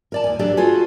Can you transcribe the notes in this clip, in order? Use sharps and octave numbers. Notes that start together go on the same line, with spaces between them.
A#4 D5 A5
D#2 G#5
F#3 D4 G4 A4 A#4 D5
F4 F#4 G#4 A4 B4